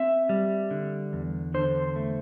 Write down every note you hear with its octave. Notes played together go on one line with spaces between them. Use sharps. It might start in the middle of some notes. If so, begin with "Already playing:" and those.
Already playing: C4 E5
G3
D3
E2
D3 C5
A3